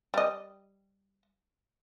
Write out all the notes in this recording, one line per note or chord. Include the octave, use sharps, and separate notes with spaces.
G3 D#5